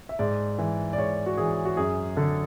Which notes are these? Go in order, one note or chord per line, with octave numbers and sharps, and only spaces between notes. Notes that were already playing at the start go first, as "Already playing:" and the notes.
E5
G#2 D5
E3
D5
G#2 C#5
F#4
E3 G#4
F#4
F#2 G#4
D3 A4